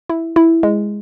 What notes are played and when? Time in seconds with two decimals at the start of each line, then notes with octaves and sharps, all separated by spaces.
0.09 E4
0.36 E4
0.63 G#3